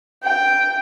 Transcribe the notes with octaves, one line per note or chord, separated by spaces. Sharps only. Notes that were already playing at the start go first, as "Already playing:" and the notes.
G5